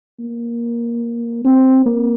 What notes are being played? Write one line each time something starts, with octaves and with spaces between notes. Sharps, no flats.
A#3
C4
A#3